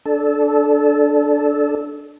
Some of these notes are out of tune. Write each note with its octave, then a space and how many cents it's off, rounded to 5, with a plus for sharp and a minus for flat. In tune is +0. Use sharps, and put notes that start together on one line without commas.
D4 +0 A4 -20